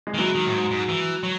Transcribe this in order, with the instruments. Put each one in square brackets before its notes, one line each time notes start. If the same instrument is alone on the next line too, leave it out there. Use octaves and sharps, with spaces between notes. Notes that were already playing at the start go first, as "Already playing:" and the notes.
[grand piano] G#3
[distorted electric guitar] D#3
[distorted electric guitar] E3 [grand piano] F#3
[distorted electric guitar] D#3
A2
G#2
G#2
E3
F#3